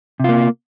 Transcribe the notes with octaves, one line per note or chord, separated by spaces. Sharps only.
C3 A#3 F4